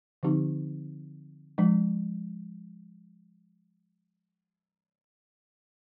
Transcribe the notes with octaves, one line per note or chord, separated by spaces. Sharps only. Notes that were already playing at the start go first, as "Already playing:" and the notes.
D3 F3 C4 D#4 G4
F3 G#3 D4